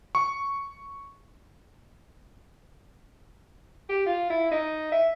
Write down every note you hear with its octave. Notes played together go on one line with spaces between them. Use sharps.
C#6
G4
F4
E4
D#4
E5